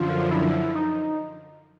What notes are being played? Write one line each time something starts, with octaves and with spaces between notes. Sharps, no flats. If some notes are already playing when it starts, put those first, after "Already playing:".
Already playing: F#2 D3 F3 F4
E4
D#4